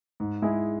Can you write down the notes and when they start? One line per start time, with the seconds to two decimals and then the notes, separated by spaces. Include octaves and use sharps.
0.20 G#2
0.42 G#3 E4 G#4